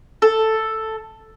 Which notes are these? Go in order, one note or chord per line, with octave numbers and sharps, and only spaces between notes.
A4